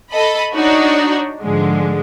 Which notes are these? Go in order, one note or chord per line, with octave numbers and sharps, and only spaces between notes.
A4 D#5 B5
D4 D#4 F#4 C#5
G#2 D3 F3 G#3